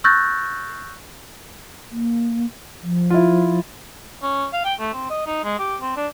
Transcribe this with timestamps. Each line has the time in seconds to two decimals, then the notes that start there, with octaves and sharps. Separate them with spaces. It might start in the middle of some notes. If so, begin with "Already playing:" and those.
0.04 C#6 E6 F#6 G6 A6 A#6
1.91 A#3
2.82 F3
3.10 E4 F4
4.23 C#4
4.53 F5
4.65 G5
4.80 A3
4.93 C4
5.10 D#5
5.26 D#4
5.44 G#3
5.59 G4
5.81 C4
5.96 D4